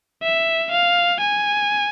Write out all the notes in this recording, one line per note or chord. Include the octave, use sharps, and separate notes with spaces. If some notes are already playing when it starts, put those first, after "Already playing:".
E5
F5
G#5